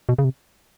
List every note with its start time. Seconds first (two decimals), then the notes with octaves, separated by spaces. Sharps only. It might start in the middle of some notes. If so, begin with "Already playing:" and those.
0.09 B2
0.18 C#3
0.24 C3